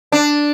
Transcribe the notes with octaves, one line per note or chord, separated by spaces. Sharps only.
D4